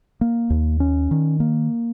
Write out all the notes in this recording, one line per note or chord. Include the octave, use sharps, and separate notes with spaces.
A#3
D#2
C#4
D#3
A#3